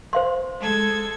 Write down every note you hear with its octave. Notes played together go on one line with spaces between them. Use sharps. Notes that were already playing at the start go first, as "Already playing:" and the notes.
C5 F5 C6
G#3 A4 G#6